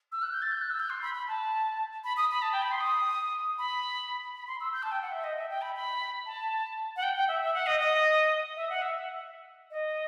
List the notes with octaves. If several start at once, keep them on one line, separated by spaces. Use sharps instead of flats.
E6
F#6
G6
A6
G6
F#6
E6
G6
C6
B5
B5
A5
B5
D#6
B5
A5
G5
B5
C6
D#6
B5
B5
C6
E6
G6
A5
G5
F#5
E5
D#5
E5
G5
B5
B5
A5
F#5
G5
G5
E5
E5
F#5
D#5
D#5
E5
F#5
E5
D#5